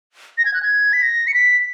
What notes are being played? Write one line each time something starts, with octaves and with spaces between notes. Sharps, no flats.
A#6
G#6
F#6
G#6
B6
A#6
C#7
B6